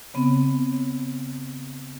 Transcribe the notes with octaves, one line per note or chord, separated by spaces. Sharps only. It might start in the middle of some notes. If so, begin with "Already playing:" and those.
C#3 B3 C4